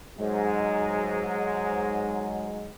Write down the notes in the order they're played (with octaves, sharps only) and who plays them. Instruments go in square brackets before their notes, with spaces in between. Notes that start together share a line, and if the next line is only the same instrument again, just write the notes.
[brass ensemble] G#2 F#3 G#3